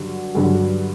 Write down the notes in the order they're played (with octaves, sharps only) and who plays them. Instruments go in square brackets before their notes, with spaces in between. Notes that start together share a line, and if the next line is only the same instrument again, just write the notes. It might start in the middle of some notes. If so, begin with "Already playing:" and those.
Already playing: [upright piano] G2 D3 F#3
G2 D3 F#3